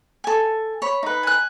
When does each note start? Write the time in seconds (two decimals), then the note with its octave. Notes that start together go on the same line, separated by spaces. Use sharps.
0.24 A4 G#5
0.82 C#5 B5
1.03 D#4 B4
1.23 G#5 F#6